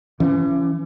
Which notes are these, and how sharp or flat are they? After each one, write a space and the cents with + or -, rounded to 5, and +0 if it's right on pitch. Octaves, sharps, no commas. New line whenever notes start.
E3 +40 C#4 +5